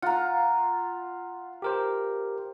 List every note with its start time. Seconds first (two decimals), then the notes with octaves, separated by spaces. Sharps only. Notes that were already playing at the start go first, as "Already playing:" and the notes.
0.02 F4 F#5 A#5
1.62 G4 A#4 C5